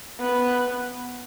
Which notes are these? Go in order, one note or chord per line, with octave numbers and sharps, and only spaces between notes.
B3